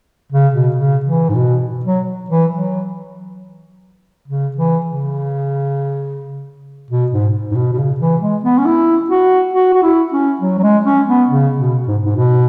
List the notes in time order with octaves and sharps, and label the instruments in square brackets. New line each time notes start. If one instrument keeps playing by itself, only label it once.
[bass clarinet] C#3
B2
C#3
E3
G#2
B2
F#3
E3
F#3
C#3
E3
C#3
B2
G#2
G#2
B2
B2
C#3
E3
G#3
B3
C#4
E4
F#4
F#4
F#4
E4
C#4
F#3
F#3
G#3
C#4
B3
C#3
B2
G#2
G#2
B2